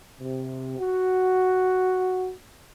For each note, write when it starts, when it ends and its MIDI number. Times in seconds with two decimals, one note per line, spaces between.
0.19 0.76 48
0.78 2.32 66